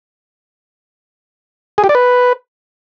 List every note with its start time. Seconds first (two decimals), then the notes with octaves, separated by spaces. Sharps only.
1.78 G#4
1.84 G4
1.89 D5
1.95 B4